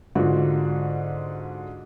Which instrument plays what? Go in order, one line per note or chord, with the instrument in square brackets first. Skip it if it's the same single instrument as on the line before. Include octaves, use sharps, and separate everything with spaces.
[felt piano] G#2 D3 F4 F#4